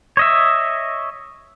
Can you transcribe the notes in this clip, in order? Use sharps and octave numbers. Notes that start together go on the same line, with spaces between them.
C#5 D#5 E5